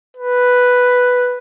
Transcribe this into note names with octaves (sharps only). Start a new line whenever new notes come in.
B4